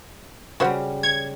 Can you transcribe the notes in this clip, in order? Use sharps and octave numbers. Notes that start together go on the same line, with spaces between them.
C#3 G3 F#4 C5 F#5
C#5 G#6